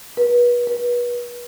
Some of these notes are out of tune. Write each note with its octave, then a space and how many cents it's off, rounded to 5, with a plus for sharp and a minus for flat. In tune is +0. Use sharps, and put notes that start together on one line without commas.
B4 -35
B4 -35